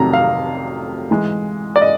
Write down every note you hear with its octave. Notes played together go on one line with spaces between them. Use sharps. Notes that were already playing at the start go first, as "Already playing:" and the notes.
Already playing: F1 F2 C3 D#3 F#3 A#5
F5
G#2 E3 G#3
D5
D#5